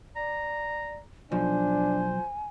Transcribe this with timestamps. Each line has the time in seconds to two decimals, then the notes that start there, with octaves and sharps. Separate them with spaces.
0.16 D5 A#5
1.32 B1 F3 D4 C5 G#5